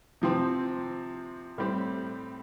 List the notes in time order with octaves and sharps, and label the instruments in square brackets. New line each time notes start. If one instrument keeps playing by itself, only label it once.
[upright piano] C3 F3 C4
A2 G3 C4 G4